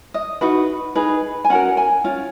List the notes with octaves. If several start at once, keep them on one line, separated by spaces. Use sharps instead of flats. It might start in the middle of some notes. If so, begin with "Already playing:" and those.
D#5
D#4 F#4 B4
D#4 G#4 B4
G#5
C#4 F#4 A#4 F#5
G#5
C#4 F4